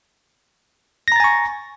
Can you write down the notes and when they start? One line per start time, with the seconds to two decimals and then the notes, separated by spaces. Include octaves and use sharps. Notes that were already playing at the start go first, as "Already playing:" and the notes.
1.08 A#6
1.12 A#5
1.16 A6
1.20 G#5
1.24 C#6